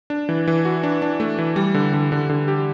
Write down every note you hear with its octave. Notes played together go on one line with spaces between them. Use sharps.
D4
E3
E3
F#4
D4
D4
A3
E3
G3
D3
D3
D3
D3
G4